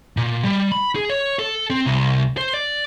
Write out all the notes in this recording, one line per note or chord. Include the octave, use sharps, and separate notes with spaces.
A#2
G3
B5
G#4
C#5
A4
C4
C2
C5
D5